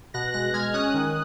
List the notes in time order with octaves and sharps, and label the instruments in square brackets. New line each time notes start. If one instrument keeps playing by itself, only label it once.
[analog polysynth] B2 F#6 A#6
G#3 F#6 A#6
G#3 F6 G#6
C#4 D#6 F#6
D#3